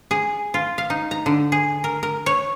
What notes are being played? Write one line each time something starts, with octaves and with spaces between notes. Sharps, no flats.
G#4
F4
F5
D#4
A#5
D3
G#4
A#4
A#4
C#5